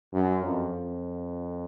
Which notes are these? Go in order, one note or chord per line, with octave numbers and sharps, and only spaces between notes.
F#2
F2